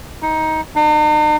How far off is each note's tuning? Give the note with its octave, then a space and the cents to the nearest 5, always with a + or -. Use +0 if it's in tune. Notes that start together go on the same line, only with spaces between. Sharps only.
D#4 +15
D#4 -45